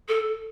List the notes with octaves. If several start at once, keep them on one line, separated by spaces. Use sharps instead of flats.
A4